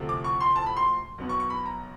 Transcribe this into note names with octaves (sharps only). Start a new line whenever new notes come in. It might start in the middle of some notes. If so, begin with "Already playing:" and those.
Already playing: D2 C3 F3 A3
D6
C#6
C6
A5
B5
C6
B1 B2 F#3 B3
C#6
C#6
B5
A#5